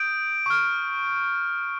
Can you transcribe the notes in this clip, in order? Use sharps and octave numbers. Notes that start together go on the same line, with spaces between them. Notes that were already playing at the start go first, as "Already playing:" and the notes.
Already playing: D#6 G6 D7
C#6 F6